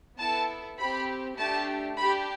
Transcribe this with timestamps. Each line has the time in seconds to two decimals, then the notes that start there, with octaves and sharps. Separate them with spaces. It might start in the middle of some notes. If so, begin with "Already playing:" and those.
0.18 B3 E4 A4 A5
0.78 C4 G4 B5
1.38 A3 D4 G4 A5
1.98 D4 G4 B5